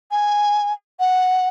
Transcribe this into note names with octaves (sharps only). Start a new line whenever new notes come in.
G#5
F#5